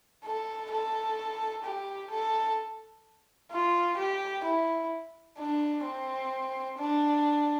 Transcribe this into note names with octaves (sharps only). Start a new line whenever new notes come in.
A4
A4
G4
A4
F4
G4
E4
D4
C4
D4